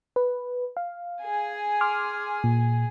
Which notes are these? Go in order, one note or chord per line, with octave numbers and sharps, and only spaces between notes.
B4
F5
G#4 G#5
C6 D6 F6
A#2